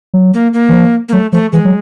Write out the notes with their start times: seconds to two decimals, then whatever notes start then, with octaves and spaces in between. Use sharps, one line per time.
0.14 F#3
0.34 A#3
0.53 A#3
0.69 E3
0.73 F3
1.09 A#3
1.13 F#3 A3
1.32 F3 A3
1.53 E3 G#3
1.65 F#3